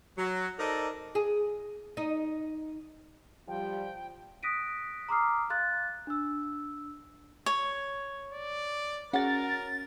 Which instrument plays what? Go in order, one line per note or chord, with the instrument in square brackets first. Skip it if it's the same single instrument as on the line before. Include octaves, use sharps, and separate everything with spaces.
[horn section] F#3
D#4 A4 A#4 C5 D5 D#5
[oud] G#4
D#4
[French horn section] F3 G3 [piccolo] G5
[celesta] D#6 F#6 A#6 B6 D7 D#7
A#5 C6 D6 D#6 F6 C7
F5 C6 F#6 A6
D4 E6
[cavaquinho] C#5
[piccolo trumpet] D5
[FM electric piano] C#4 A6 [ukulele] F#4 G#4 F#5 [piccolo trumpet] A#4